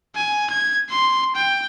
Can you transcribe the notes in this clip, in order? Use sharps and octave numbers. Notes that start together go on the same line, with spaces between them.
G#5
G#6
C6
G5